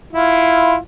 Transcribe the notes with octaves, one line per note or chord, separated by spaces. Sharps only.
E4 F4